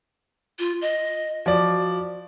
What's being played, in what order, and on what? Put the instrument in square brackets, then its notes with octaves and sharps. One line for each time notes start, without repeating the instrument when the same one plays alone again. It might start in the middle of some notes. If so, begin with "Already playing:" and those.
[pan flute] F4
D#5
[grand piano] F3 D5 [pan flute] F#4